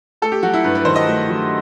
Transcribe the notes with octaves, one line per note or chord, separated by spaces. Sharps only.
A3 A4
G4
F#3 F#4
E4
G2 B4
B4
D#3 C5
D#5
A3
F#3